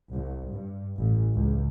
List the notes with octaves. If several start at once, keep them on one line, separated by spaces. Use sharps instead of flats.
C2
G2
A1
C#2